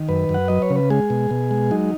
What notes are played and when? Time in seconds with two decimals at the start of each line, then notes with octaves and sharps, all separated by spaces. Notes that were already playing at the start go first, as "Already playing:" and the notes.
Already playing: D#3
0.08 F#2 B4
0.29 F#2
0.34 F#5
0.48 F#3 D#5
0.62 C#5
0.70 C#3
0.76 B4
0.90 G#3 G#4
1.10 B2
1.31 B2
1.51 G#3
1.71 F#3 D#4